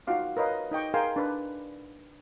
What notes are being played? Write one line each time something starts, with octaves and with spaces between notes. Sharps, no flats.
D#4 F4 F#4 F5 D6
A#4 B4 C#5 D#5 F5
D#4 D#5 G5 C#6
G#4 A#4 F5 G5 G#5 C6
D4 B4 D5